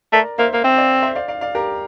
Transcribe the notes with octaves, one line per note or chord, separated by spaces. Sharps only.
A3 A#4 D5
A#3 C5 E5
A#3
C4 E5 G5
D5 F5
C5 E5
D5 F5
D5 F5
D5 F5
G4 A#4